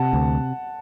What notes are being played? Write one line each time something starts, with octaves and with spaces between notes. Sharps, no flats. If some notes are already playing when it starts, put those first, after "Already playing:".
Already playing: C3 F#5 A5
D2